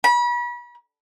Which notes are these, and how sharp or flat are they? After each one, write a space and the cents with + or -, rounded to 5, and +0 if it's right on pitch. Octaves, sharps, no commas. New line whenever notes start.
B5 -35